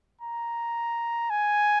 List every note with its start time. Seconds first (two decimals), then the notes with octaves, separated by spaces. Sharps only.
0.21 A#5
1.30 G#5